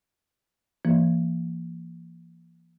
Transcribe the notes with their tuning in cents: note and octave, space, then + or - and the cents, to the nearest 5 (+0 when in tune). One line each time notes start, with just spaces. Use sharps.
E3 +45 A#3 +0